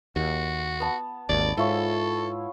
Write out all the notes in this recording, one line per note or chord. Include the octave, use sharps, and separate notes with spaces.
D#2 F#4
B3 A5
G#1 D#2 D5
G#2 E4 F4 A4 C#5